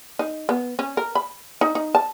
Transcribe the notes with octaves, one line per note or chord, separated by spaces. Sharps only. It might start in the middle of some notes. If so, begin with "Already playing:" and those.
D#4
B3
C#4
A#4
B5
D#4
D#4
A5